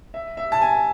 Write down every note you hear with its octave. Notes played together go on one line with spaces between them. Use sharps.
E5
E5
A5
G#5